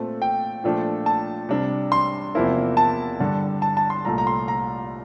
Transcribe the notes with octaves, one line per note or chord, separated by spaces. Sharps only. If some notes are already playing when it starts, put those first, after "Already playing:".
Already playing: A#2 A3 C4
G5
A#2 F3 A3 D4
A5
C3 G3 D4
C6
E2 C3 F3 A#3 E4
A5
G2 D3 G3
A5
A5
C6
C2 A#2 A3 A#5
A#5
C6
A#5